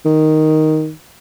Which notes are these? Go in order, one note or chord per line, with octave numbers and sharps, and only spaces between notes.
D#3